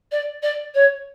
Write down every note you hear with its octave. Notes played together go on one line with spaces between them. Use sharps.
D5
D5
C#5